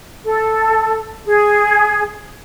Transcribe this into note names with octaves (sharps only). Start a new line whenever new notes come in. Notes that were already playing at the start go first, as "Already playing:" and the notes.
A4
G#4